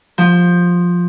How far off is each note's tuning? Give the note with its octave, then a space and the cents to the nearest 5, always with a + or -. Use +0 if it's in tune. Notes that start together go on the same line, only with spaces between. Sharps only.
F3 +10